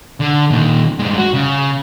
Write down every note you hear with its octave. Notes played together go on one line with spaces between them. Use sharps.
D3
A#2 D#3
G2 G#3
F#4
C#3